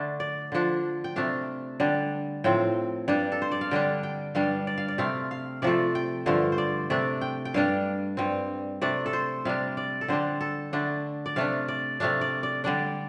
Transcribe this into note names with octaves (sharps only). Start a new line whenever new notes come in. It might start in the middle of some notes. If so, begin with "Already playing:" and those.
Already playing: D3 A3 D4
D5
D3 F3 D4
G5
C3 A3 D4 F5
D3 G3 D4
A2 F3 C4 G5
G2 G3 D4
A4
C5
D5
F5
D3 G3 D4 G5
G5
G2 G3 D4 F5
D5
F5
D5
C3 A3 C4 F5
F5
C3 F3 A3 D5
G5
G2 D3 F3 A3 F5
C5
D5
C3 A3 D4 D5
G5
G5
G2 G3 D4 F5
G2 G3 C4
C3 A3 D4 D5
A4
C5
C3 G3 D4 F5
D5
A4
D3 G3 D4 C5
A4
D3 A3 D4
D5
C3 A3 D4 F5
D5
C3 A3 D4 F5
D5
D5
D3 G3 D4 D5